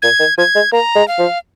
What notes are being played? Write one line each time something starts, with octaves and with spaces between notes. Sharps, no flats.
A#2 G#6
D#3
F3 G#6
G#3
A#3 A#5
G#3
F5
F3